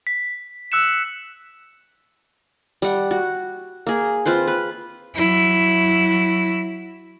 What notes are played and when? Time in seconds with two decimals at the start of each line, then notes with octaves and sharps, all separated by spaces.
0.07 B6
0.72 E6 F#6 C#7 E7
2.82 G3 F#5
3.11 F#4
3.87 A#3 G#4
4.26 C4 F4 B4 C5
4.47 B4
5.16 F#3 E4